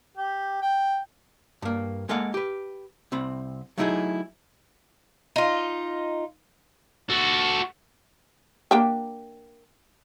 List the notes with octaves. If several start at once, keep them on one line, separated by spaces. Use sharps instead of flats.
G4
G5
G2 A#3
G#3 A#3 A4 D#5 F5 F#5
G4 B4
C2 C4 B5
F#3 A3 D#4 E4 F#4 G#4
D#4 F4
F#4 A4
A#3 D4 G4